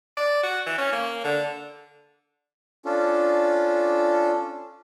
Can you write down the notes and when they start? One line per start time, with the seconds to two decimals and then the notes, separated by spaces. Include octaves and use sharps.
0.17 D5
0.43 F#4
0.66 E3
0.78 C#4
0.92 A#3
1.24 D3
2.85 C#4 D4 F4 A4